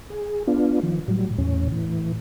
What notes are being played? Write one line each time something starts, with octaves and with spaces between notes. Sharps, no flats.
G#4
B3 D4 F4
D#3 F3
A2 F#3 G3
E2 A2 C#4
A2 E3